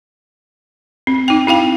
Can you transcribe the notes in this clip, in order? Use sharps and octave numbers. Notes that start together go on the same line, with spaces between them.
C4
D#4 G5
C4 E4 F5 G5